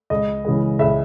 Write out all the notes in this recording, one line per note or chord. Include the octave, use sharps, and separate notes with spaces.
C#2 D#5
C#3 E3 G#3
C#2 E5